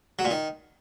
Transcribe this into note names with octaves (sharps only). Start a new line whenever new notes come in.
F#3
A#2
D#3